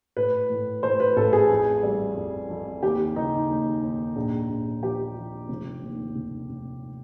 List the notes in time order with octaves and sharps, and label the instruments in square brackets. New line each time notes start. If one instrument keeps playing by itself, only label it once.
[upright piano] A2 B4
A2
A2 C5
B4
A1 A4
G#4
F2
G3
F2
F2
D#2 G4
C#3 D#4
D#2
D#2
A#1
A#1
F3 G4
F3
F1
D#2
F1
F1